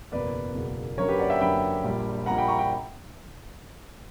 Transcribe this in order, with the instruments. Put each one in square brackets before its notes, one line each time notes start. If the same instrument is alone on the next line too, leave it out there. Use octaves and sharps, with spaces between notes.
[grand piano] F#1 E2 B2 A#3 B4 D5
F#1 E2 B2 A#3
F#2 D3 F#3 A#3 A#4 C#5
G4 B4
D5 F#5
E5 G5
F#2 D3 F#3 A#3 G5 B5
A#1 A#2 G3 A#3
A#1 A#2 G3 A#3 F#5 A#5
G5 B5
A#5 C#6
G5 B5